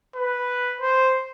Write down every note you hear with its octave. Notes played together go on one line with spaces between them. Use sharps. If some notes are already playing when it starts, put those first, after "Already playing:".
B4
C5